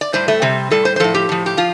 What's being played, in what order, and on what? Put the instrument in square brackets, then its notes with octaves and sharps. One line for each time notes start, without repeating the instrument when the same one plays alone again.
[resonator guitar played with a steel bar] D5
A2 G3 C5
A3
C3 G3 C4
A2 G3 A4
C5
C5
A2 F3 A4
G4
A2 F3
G4
F3 F4